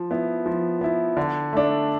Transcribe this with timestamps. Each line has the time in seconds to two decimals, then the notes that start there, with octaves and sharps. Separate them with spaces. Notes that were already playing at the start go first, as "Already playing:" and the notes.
Already playing: F3
0.11 B3 E4
0.46 F3
0.81 B3 E4
1.17 D3
1.53 A3 D4